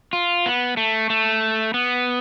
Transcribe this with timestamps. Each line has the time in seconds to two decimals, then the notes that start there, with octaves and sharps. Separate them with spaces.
0.13 F4
0.46 B3
0.77 A3
1.10 A3
1.74 B3